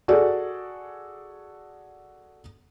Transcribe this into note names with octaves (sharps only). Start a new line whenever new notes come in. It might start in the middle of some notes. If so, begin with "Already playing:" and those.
F#4 G#4 A4 D5